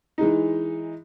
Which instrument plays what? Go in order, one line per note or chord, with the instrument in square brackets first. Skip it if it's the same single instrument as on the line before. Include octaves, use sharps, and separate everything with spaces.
[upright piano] E3 G#3 D#4